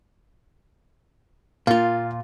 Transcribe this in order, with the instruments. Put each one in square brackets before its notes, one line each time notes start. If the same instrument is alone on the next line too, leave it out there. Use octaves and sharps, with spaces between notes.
[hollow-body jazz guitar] A#2 F4 [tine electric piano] F5